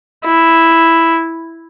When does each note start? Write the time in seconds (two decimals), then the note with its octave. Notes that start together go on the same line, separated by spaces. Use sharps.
0.25 E4